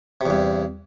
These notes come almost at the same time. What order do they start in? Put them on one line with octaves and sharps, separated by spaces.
C3 E2 G2